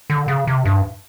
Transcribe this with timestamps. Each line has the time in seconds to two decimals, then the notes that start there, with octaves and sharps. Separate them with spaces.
0.10 D3
0.28 C#3
0.47 C3
0.65 G2